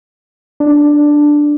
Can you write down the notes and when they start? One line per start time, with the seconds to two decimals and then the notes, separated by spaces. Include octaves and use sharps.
0.60 D4